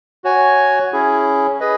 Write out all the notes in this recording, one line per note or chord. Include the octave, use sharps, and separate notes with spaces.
F#4 C#5 G#5
C#4 E4 G#4
G#4 B4 D#5